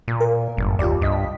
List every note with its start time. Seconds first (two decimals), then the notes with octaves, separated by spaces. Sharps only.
0.08 A#2
0.20 A#4
0.57 G1 F#2 A2
0.79 D#2 F4 G4 D5
1.02 C2 G2 D#5 B6